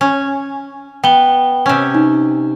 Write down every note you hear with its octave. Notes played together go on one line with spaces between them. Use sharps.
C#4
B3 G5 G7
C3 C#4
D#4